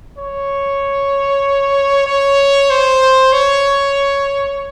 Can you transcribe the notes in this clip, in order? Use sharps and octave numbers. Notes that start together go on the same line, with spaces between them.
C#5
C#5
C5
C#5